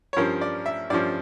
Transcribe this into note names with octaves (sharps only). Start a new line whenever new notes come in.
C#5
G2 F3 C#4 A#4
D5
E5
G2 F3 C#4 D5